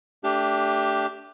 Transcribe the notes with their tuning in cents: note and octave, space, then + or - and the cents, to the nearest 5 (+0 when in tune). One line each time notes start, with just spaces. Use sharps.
A3 +0 D4 -15 G4 +0